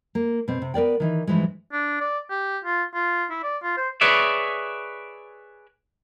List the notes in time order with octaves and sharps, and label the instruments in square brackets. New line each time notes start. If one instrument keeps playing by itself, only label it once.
[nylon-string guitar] A#3
B2 C4
C3
B3 A#4 D5 G5
D#3 E3 D#4
G2 D3 E3 F3 G#3
[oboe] D4
D5
G4
F4
F4
E4
D5
F4
C5
[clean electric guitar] G#4 B4 C#5 D5 E5